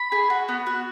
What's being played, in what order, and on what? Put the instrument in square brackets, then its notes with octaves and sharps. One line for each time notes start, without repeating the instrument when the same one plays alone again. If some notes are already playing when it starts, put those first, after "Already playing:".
Already playing: [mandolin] B5
G#4
F#4
B3
F#4